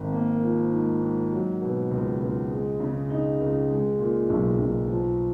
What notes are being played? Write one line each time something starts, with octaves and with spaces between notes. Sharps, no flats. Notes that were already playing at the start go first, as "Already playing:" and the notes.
Already playing: G#1
A#3
F3
G#2
G#2
F#3
B2
C#2
C#2
G#3
C#3
D#4
C#2
G#3
A#2
B1
B1
F3